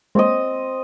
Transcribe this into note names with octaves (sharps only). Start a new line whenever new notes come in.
G#3 A#3 C4 C#5 D#5